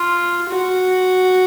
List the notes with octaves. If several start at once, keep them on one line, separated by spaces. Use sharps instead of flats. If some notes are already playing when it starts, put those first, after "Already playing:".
Already playing: F4
F#4